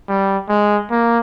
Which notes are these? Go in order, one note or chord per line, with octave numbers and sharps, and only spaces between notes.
G3
G#3
A#3